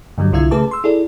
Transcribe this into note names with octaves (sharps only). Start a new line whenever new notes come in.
G2 D3 F#3 G3
C2 D3 E4 F4 E5 G#6
C#3 A3 G#4 B4 A5 D6
C6 E6
E4 G#4 A4 D5